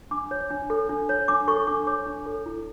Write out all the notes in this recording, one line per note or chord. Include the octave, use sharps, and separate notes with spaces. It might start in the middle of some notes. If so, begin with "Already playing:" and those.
D4 D6
C#5
D4
A4
D4
C#5
D4 D6
A4 C#6
D4 D6
C#5 D6
D4
A4
E4